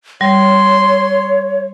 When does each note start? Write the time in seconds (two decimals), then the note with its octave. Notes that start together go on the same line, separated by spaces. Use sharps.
0.21 G3 C#5 C6